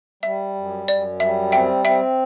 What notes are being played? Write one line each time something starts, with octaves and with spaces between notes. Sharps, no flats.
G3 E5
F#2
F#2 D5
G3 E5
C4 E5 G5
C4 E5 G5